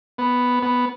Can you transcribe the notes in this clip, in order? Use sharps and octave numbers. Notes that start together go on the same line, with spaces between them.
B3
B3